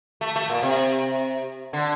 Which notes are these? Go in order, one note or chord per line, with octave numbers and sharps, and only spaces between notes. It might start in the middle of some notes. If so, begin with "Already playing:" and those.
A3
A3
A#2
C3
D3